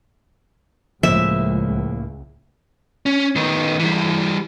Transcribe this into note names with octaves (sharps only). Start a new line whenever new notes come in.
C#2 A2 F3 A#3 E5
C#4
D#3 B3
E3 G3